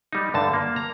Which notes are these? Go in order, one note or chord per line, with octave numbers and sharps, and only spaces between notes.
G3 D#4
G2 D3 A5
A#3
A#5